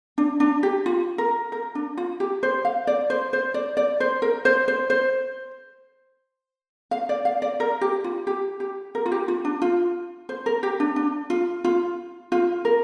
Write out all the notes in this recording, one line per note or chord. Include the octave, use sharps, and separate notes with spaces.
D4
D4
G4
F4
A#4
A#4
D4
F4
G4
C5
F5
D5
C5
C5
D5
D5
C5
A#4
C5
C5
C5
F5
D5
F5
D5
A#4
G4
F4
G4
G4
A#4
F4
G4
F4
D4
F4
C5
A#4
G4
D4
D4
F4
F4
F4
A#4